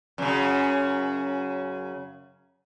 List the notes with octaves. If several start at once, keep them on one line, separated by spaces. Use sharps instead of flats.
F#2 C#3